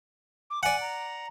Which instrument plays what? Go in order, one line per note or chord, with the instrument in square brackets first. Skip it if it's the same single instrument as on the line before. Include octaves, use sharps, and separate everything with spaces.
[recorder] D6
[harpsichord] D5 F#5 [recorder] G#5
[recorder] A#5